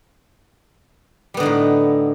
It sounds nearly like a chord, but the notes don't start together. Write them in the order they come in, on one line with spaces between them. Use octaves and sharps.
G3 B3 D3 D#4 A2